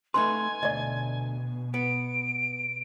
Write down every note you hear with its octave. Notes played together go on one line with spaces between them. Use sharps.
A3 D#4 B4 G#5 C6
D2 B2 D5 D#5
B3 D7